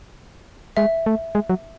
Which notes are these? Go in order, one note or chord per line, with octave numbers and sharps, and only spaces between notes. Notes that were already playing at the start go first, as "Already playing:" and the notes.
G#3 E5
A3
G#3
F#3